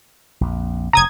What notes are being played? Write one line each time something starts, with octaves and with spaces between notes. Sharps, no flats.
A#1 F2
F1 C3 A#5 D#6 G#6